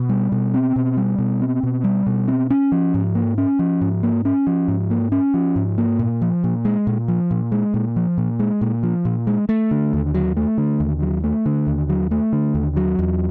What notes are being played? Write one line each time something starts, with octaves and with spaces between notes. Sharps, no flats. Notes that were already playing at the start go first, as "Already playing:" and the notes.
Already playing: B2
G3
B2
C4
B2
G3
B2
C4
B2
G3
B2
C4
C#4
F3
G#2
A#3
C#4
F3
G#2
A#3
C#4
F3
G#2
A#3
C#4
F3
G#2
A#3
A#2
F3
A#2
G#3
A#2
F3
A#2
G#3
A#2
F3
A#2
G#3
A#2
F3
A#2
G#3
A3
D3
D#2
F#3
A3
D3
D#2
F#3
A3
D3
D#2
F#3
A3
D3
D#2
F#3
E2